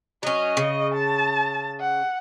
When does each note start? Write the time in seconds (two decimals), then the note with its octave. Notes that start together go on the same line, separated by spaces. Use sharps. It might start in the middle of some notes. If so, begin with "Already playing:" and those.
0.23 F#3 C#4 D#5
0.57 C#3
0.94 A5
1.80 F#5